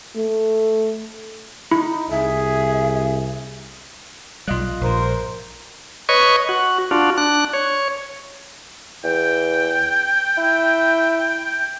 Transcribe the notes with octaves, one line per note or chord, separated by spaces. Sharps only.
A3
D#4 E4
C2 G#4 E5
B1 G3 F4 D#5 F5 F#6
A#1 G2 A#4 C5
B4 C#5 D#5 C#6
F#4
D4 F4 F#4
D4 F#6
C#5
E2 G5
E4